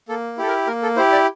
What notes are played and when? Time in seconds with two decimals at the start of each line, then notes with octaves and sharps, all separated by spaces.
0.09 A#3 A4
0.37 E4 G4 A4
0.48 A#4
0.67 A#3 A#4
0.82 A4
0.96 E4 G4 C5
1.12 D5